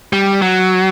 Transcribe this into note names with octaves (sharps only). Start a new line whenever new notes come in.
G3
F#3